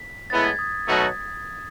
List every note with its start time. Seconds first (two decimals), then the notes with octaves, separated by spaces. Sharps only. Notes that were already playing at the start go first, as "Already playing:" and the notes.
Already playing: B6
0.30 A2 G#3 B3 E4 A6
0.44 G#6
0.59 D#6
0.87 B2 F#3 A3 D#4 F#4